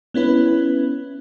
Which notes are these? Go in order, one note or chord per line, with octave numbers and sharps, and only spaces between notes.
B3 C#4 E4 B4